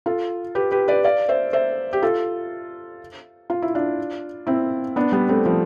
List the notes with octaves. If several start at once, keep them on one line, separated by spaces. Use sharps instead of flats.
F4 A4
G4 B4
G4 B4
B4 D5
D5 F5
C5 E5
C5 E5
G4
F4 A4
F4
E4
D4 F4
C4 E4
B3 D4
G3 B3
A3 C4
F3